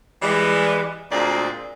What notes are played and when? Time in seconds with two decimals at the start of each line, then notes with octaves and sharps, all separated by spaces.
0.22 E3 G3 G#3
1.12 D2 A#2 G#3 A#3 C4 D5